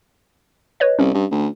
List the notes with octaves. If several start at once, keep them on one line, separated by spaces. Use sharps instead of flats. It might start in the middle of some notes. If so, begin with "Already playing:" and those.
B4 C#5 D#5
C2 C#4
G2
D2